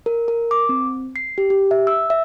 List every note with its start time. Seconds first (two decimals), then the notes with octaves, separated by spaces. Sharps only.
0.06 A#4
0.28 A#4
0.51 D6
0.69 C4
1.16 C7
1.38 G4
1.50 G4
1.71 E5
1.87 E6
2.10 E5